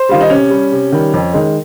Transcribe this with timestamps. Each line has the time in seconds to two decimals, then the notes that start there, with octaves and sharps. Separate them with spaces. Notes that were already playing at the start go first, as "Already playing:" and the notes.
Already playing: C5
0.09 D#3 G3 F4
0.21 D#4
0.30 C3 C#4
0.50 G3
0.72 C3
0.92 D#3 G3
1.14 F2
1.34 D#3 G#3